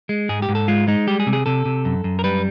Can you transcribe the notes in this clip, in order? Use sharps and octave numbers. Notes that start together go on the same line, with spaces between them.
G#3
G#2 G#4
G4
G#2
A4
G#3 F4
G#3 D#4
G3 G4
G#4
C3
G#4
C3 A4
C3
F#2
F#2
A#4
G3 B4